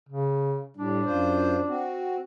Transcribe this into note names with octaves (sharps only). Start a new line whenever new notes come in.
C#3
A2 G3 D4
F#2 F4 C5
C4 F#4